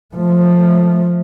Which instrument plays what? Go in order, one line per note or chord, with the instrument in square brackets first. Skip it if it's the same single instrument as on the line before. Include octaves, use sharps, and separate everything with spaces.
[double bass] F3 A3